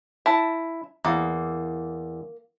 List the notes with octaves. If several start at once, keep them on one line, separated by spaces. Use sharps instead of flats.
E4 A5
E2 A#3